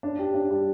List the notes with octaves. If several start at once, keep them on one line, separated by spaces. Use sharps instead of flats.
D4
G4
D4
G3